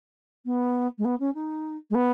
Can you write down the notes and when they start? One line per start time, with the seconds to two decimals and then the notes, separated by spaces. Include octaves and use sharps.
0.45 B3
0.98 G#3
1.04 B3
1.19 C#4
1.34 D#4
1.90 G#3
1.94 B3